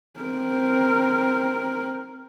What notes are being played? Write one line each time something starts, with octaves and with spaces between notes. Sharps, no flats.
C4 A#4